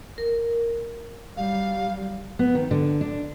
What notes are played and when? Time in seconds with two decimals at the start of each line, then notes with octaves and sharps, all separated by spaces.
0.18 A#4
1.37 F#3 G3 F5
2.39 B3
2.55 D#3
2.71 D3
3.01 D4